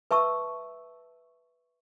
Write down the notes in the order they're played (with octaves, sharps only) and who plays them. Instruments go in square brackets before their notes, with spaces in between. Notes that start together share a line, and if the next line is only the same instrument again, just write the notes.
[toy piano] B4 E5 A5 C#6 E6